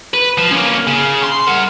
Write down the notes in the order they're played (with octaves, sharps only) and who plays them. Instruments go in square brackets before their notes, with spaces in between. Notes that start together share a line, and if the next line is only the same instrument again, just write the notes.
[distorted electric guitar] B4
F3
A#3 C#4
C#3
C6
A#4 F#5